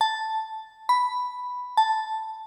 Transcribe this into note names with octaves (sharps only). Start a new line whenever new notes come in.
A5
B5
A5